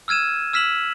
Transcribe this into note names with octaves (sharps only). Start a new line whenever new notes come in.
E6 F6 G#6 D#7 E7
E6 F6 B6 E7 F#7